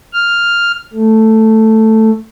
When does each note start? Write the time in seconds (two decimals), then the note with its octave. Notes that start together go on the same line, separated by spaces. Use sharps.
0.13 F6
0.94 A3